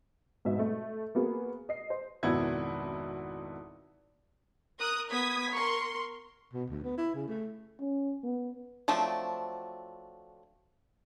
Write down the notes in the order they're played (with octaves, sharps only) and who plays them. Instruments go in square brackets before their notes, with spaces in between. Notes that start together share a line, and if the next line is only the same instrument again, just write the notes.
[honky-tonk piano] G#2 B2 E5
A3
A#3 B3 F#4 G#4
D#5 C7
C5
[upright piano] G#1 F2 B2 B3 E4 G#6
[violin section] A#4 D#6 F#6
[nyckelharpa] B3 [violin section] D#6 G#6 B6
[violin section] A#4 C6 [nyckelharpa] C#6
[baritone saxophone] B2
D2
B3
E4
C#3
A3
[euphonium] C#4
B3
[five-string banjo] F3 F#3 A3 C4 D4